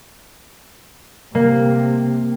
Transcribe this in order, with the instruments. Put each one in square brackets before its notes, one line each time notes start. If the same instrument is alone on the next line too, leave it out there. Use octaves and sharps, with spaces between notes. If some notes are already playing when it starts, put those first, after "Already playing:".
[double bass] C3 [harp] A#3